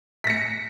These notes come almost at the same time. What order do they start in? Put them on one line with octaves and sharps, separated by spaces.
B6 A#6 C#7